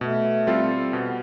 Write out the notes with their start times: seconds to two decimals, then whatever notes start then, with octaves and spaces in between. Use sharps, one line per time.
0.01 B2 A3
0.47 G3 C4 F4 A4
0.93 B2 B3